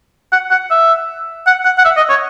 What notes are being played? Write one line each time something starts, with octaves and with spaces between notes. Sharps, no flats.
F#5
F#5
E5
F#5
F#5
F#5
E5
D#5
C#5